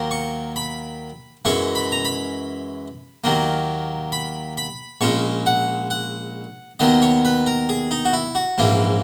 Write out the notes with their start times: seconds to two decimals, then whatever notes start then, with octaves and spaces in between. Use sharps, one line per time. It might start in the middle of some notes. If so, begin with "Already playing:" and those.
Already playing: D#2 D#3 F#3 A#3
0.11 C#6
0.56 B5
1.45 F#2 E3 G#3 C#4 C#6
1.75 B5
1.92 A#5
2.05 B5
3.24 D#2 D#3 F#3 A#3
4.12 B5
4.57 B5
5.01 A#1 A#2 G#3 C#4 C#6
5.46 F#5
5.90 F#5
6.79 D#2 D#3 F#3 B3 D#5
7.02 C#5
7.25 B4
7.46 A#4
7.69 G#4
7.91 D#4
8.05 F#4
8.13 E4
8.35 F#4
8.58 A#1 G#2 E3 A#3 C#4